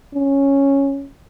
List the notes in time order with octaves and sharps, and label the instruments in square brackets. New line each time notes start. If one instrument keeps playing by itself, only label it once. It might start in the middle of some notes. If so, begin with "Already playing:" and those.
[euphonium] C#4